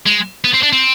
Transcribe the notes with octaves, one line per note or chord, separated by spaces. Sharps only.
G#3
B3
C4
D4
C4